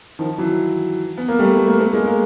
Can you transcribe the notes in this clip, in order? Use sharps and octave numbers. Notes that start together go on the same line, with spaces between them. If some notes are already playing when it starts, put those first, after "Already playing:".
D#3 F3
E3 F#3
B3
A#3
G3 A3
A3
A#3
A3 B3
G#3 A#3
G#3 A#3